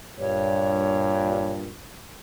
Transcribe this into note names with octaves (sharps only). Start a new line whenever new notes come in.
G2 A#2 C#5